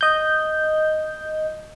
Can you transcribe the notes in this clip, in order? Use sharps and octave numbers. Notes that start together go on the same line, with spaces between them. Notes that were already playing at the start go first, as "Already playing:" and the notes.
D#5 G6